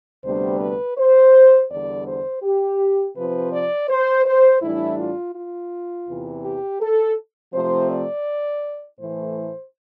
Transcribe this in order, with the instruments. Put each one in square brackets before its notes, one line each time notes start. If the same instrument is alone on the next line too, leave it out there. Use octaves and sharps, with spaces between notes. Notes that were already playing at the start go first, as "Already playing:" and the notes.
[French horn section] D2 C3 G3 B3 D4 C5
B4
C5
E2 D3 G3 D5
C5
G4
C3 F3 C4 B4
D5
C5
C5
A2 E3 G3 D4 E4
F4
F4
E2 C3 E3
G4
A4
C3 F3 A3 C4 C5
D5
A2 E3 A3 C5